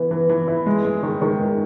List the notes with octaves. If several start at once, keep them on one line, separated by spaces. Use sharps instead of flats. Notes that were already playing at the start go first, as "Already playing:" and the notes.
Already playing: E3 B3 E4
E3
E3
E4
G#3
G#3
D#3
D#3
G#3